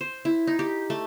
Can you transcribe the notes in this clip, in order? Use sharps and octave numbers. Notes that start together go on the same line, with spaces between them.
C5
E4
D#4
G4
A3